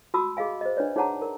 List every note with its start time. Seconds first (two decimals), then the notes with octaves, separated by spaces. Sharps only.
0.14 F#4 A5 B5 D#6 E6
0.37 G#4 D#5 F5 G#5
0.61 C5 D#5
0.77 D4 B4 C#5 D5
0.96 D#4 G#4 C#5 F#5 A5 A#5
1.22 A#4